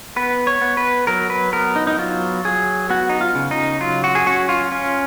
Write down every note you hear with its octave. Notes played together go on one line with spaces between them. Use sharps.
B3 B4
C#5
B3
B4
F#3 A#4
B4
B3 A#4
D#4
D#4
F#3 F4
F#3 G#4
B3 F#4
D#4
F4
C#3
D#4
F#3 F4
F#4
G#4
C#4 F#4
F4
C#4